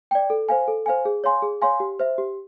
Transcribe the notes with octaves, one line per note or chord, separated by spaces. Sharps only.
D5 G5
A4
C5 F5 G#5
A4
C5 F5 G#5
G#4
C#5 F5 G#5 C6
G#4
C#5 F5 G#5 C6
G4
C5 E5
G4